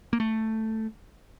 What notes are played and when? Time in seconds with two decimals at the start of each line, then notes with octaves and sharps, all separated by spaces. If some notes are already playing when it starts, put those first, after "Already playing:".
0.13 A#3
0.20 A3